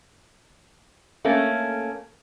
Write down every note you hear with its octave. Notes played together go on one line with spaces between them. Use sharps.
A3 A#3 C#4